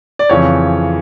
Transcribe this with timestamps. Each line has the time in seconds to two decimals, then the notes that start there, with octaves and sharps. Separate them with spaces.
0.19 D5
0.29 F2 C#3 E3 C#5